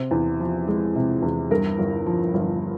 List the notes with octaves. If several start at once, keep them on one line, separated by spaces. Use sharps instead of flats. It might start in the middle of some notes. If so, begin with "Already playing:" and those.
Already playing: C3 C5
E2
F3
G#3
C3
E2
G2 A#4
G1
F3
G1